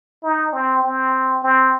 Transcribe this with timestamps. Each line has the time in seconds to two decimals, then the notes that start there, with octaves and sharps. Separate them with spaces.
0.23 D#4
0.53 C4
0.83 C4
1.43 C4